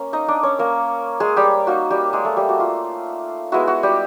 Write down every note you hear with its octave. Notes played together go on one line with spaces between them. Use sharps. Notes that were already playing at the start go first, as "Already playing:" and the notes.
Already playing: A#3 C#4
D#4 D#5
D4 D5
C#4 C#5
A#3 A#4
G#3 G#4
G3 G4
A#3 D#4 F#4
G3 G4
G#3 G#4
A3 A4
G3 G4
F#4
F4
G#3 B3 E4 F#4
F#4
G3 G4